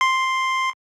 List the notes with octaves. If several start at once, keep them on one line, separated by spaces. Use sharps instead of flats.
C6